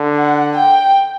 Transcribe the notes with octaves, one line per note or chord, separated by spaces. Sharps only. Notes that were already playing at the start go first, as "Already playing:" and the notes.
Already playing: D3
F#5
G5